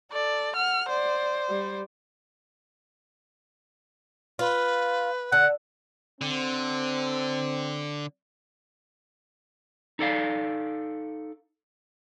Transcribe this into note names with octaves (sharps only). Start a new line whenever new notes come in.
A4 D5
F#5 F6
C5 D5
G3
F4 B4
D3 F#5
D3 C4
D#4 A4 D5 F5